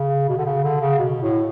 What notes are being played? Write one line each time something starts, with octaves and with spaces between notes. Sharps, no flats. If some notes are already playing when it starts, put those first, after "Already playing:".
Already playing: C#3
B2
D3
C#3
D3
C#3
B2
A2